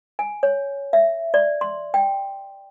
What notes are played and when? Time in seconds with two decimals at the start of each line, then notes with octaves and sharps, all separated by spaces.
0.19 G#5
0.43 C#5
0.93 E5
1.34 D5
1.61 C6
1.94 G5